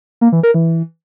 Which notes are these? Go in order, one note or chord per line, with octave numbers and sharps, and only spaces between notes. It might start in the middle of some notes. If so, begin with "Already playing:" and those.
A#3
E3
A#4
E3